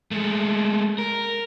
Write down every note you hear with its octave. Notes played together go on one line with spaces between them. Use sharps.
G#3 A3
A#4